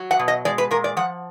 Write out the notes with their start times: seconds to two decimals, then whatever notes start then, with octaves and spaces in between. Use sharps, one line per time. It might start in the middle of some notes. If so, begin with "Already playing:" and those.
Already playing: F#3
0.11 F#5
0.19 B2
0.28 D#5
0.45 G#3 D5
0.58 B4
0.71 A#2 A#4
0.84 D5
0.97 F3 F#5